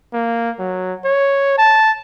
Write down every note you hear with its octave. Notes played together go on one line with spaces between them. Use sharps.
A#3
F#3
C#5
A5